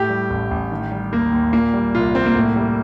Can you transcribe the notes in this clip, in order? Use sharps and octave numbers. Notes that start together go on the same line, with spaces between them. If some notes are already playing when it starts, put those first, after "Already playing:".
Already playing: A2 G4
G3
A1
A1
D#3
G3
D#2 A#3
D#2
A#2 A#3
G3
C2 F4
C2 C4
A#3
A2
G3